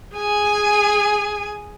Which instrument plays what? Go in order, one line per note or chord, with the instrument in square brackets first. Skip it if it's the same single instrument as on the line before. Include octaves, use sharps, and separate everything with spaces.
[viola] G#4 G#5